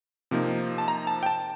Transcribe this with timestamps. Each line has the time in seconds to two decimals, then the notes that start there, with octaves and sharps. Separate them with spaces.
0.31 C3 F3 A#3 D#4
0.78 A5
0.88 A#5
1.07 A5
1.23 G5
1.26 A5